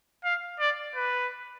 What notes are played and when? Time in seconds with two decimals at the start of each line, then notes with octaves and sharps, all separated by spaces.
0.24 F5
0.59 D5
0.95 B4